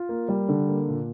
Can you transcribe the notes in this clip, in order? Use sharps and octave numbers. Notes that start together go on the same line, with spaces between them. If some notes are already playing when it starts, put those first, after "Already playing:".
Already playing: F4
A#3
G3
D3
A#3
A#2